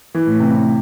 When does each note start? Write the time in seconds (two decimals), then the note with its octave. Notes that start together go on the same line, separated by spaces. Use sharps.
0.15 E3
0.27 A2
0.40 C3